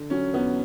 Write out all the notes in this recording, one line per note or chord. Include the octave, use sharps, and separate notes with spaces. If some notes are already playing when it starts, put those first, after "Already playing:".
Already playing: D3
F#3 C#4
E2 B3